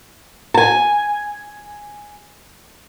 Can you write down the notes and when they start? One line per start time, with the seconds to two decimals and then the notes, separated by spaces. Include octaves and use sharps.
0.54 G#5 A5